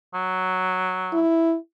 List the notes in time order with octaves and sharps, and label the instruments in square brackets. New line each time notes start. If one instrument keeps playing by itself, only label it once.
[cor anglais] F#3
[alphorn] E4